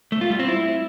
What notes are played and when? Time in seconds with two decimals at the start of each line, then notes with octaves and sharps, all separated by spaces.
0.12 A3
0.21 F4
0.30 G3
0.39 C4
0.48 E4